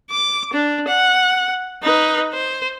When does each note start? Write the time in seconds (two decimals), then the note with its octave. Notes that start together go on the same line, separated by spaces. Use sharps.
0.10 D6
0.53 D4
0.88 F#5
1.83 D#4 B4
2.34 C5